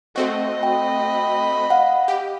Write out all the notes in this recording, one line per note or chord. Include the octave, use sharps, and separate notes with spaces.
A3 C4 F#4 D#5
G5 B5
F5 F#5
G4